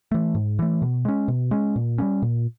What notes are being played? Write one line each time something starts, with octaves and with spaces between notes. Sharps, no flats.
E3 A3
G#2
E3 A3
B2
G#3 C#4
B2
G#3 C#4
A#2
G3 A#3 C#4
A#2